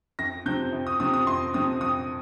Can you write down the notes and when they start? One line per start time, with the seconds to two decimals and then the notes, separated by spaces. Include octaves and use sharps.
0.19 F2 A#6
0.46 C3 F3 C4 G6
0.73 F2
0.87 D#6
1.00 C3 F3 C4 D#6
1.14 D#6
1.27 F2 C6
1.54 C3 F3 C4 D#6
1.81 F2 D#6